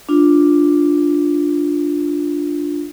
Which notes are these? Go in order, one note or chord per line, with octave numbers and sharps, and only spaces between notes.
D4 F4